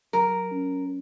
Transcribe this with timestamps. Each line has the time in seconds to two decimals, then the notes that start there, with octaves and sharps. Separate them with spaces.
0.13 F#3 A#4
0.51 C#4